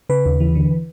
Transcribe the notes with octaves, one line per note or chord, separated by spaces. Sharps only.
C#3 B4
D#2
E3
D3